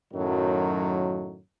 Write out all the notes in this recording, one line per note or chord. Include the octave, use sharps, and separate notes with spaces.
F#2 A2 D#3 F#3